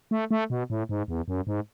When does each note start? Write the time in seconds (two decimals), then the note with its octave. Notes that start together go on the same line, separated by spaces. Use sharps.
0.11 A3
0.31 A3
0.50 B2
0.70 A2
0.89 G#2
1.08 E2
1.28 F#2
1.47 G#2